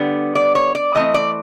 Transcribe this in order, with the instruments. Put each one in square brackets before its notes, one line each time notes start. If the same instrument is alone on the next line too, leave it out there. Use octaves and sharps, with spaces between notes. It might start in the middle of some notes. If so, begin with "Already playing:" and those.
Already playing: [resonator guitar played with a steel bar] D3 G3 B3
D5
C#5
D5
E3 A3 C4 D#5
D5